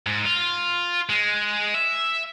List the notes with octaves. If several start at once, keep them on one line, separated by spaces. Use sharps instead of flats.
G#2
F4
G#3
E5